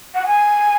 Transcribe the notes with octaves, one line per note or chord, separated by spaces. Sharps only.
F#5
G#5